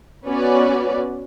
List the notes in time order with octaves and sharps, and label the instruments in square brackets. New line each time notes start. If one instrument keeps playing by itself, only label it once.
[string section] B3 C#4 F#4 B4 C#5 D5